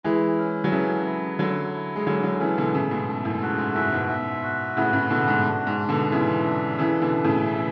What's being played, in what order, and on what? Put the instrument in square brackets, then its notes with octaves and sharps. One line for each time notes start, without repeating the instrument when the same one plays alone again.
[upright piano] E3 G#3 [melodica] E4
[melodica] C#4
[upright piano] F#3
[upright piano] C#3 E3 [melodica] A4
[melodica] E4
[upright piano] D3 F#3 [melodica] E4
[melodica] E4
[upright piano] G#3
[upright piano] D3 F#3 [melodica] C#4
[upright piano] D3 F#3
[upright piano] C#3 E3 [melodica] A4
[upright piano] B2 D3
[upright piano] A2 C#3 [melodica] A4
[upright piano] G#2 B2
[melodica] A4
[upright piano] F#2 A2
[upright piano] G#2 [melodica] F#4
[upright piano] G#2
[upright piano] F#2 A2 [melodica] E5
[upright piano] G#2 B2
[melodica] E5
F#4
[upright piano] A2 C#3 [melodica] B3
[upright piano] A2 C#3
[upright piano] B2 D3 [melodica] F#4
[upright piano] G#2
[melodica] D4
[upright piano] G#2
[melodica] D4
[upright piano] B2 D3
[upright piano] C#3 E3 [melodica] E5
[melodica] D4
[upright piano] C#3 E3 [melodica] A4
[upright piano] B2 D3
[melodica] E5
[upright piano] A2 C#3
[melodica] A4
[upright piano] E3